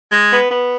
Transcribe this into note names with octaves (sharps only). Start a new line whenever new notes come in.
G#3
B3
B3